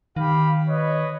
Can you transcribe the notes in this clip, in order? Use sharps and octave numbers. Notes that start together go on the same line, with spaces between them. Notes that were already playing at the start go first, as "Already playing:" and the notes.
D#3 G4 F5 B5
B4 C#5 D#5